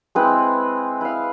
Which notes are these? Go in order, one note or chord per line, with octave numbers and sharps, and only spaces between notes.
G#3 C4 E4 B4
E4 B4 F5